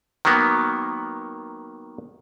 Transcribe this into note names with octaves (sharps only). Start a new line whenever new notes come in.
D#3 F#3 A#3 B3